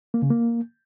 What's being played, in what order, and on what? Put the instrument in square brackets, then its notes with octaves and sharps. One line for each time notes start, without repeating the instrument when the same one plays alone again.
[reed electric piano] A#3
C#3
A#3